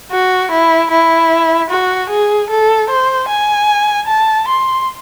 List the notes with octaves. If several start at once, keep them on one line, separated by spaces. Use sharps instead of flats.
F#4
E4
E4
F#4
G#4
A4
C5
G#5
A5
C6